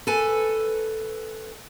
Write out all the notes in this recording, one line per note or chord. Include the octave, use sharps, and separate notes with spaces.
A4 B4 G#5